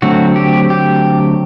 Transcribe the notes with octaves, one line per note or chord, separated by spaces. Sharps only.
D3 F#3 A3 C4 F#4
G4
G4